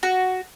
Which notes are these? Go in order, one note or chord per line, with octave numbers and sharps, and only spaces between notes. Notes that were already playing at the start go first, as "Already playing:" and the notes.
F#4